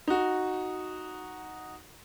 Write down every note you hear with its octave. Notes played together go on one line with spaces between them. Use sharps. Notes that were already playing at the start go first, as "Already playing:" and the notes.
D#4 F#4